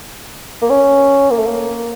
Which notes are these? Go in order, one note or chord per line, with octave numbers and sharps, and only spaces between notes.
A#3
C#4
A#3
A3
A#3